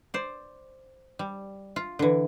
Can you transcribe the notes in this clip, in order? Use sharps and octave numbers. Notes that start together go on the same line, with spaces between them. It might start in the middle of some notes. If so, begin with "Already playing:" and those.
C5 D5
G3
F4
D3 E3